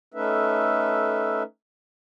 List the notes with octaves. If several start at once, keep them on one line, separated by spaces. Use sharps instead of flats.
A3 C#4 D#4 A4 B4 E5